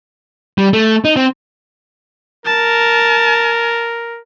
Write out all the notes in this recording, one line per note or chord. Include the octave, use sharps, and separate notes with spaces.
G3
A3
D#4
C4
A#4 A5